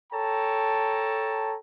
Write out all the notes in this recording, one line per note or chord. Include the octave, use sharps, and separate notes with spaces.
A4 C#5 G5 A5 A#5